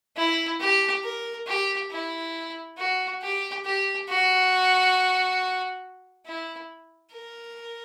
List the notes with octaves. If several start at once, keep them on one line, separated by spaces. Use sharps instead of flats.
E4
G4
A#4
G4
E4
F#4
G4
G4
F#4
E4
A#4